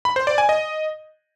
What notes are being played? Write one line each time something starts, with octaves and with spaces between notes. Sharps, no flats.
B5
C5
D5
G#5
D#5